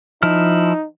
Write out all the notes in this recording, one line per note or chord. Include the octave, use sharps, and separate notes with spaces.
F3 D#4 E4 F6